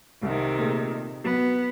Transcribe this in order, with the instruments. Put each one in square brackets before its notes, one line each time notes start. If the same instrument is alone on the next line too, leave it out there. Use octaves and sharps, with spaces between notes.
[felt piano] C2 [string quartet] C3 D#3
[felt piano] A#2 A3 G#4
[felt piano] F#3 [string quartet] B3